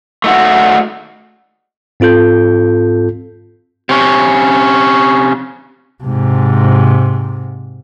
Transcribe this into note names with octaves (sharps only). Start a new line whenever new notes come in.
A3 D#4 F#4
G#2 C4 F4 A4 G6
C3 C#4
G#2 C3